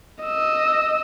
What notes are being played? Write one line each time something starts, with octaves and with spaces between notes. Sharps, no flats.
D#5 E6